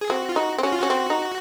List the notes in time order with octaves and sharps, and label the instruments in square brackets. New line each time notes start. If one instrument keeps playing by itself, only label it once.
[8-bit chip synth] G#4
[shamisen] C4 [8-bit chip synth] F#4
[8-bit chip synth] F4
[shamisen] D#4 [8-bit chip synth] F#4
[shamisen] C4
[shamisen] C#4 [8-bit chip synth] F#4
[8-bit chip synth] F4
[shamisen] C#4 [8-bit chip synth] F#4
[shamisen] C4
D#4